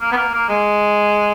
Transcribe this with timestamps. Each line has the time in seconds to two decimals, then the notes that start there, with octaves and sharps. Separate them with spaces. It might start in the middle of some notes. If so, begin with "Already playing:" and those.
0.01 A#3
0.12 B3
0.17 A#3
0.34 A#3
0.49 G#3